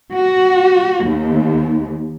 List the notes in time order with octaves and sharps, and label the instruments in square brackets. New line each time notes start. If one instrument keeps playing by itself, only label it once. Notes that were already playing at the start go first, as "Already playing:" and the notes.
[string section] F#4
D#2